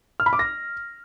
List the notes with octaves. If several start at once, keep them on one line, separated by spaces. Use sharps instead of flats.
F6
B5
D6
A#6